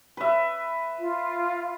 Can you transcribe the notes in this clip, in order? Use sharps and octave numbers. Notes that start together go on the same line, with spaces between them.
B4 E5
F4